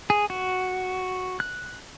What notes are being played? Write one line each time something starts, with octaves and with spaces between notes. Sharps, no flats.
G#4
F#4
F#6